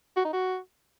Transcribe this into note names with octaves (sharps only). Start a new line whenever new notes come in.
F#4
D#4
F#4